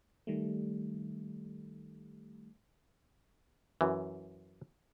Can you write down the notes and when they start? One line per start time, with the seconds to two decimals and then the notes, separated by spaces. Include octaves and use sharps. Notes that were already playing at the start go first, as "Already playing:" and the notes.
0.27 D#3 G3 A3
3.81 F#2 E3